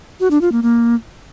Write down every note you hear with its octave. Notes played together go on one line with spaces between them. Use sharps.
F#4
D4
F4
A#3
A#3